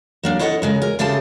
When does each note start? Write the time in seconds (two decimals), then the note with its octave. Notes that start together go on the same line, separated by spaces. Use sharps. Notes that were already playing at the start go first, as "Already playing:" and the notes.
0.23 F#3 A#3 D4
0.39 E4 A4 C#5 D#5 E5 F#5
0.62 C#3 G#3 A#4
0.82 A#4 G#5
0.99 C#3 A3 G4 G#4 C5 A5